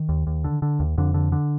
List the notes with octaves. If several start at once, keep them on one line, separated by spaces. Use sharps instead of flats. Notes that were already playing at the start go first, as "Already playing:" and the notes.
Already playing: D#3
D#2
D#2
D3
D3
D#2
F2 D3
D3
D3